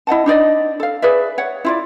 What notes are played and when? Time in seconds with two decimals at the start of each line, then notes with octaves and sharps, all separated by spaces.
0.07 E4 D#5 F#5 A5
0.26 D4 D#4 D5 D#5
0.80 A4 F5
1.02 G#4 B4 D5 E5
1.38 C#5 F#5
1.65 E4 F4 D5